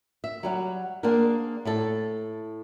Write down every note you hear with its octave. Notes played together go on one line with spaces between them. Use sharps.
E5
F#3 G3 F#4
A#3 C4 D4 G#4 A#4
A2 E4 A4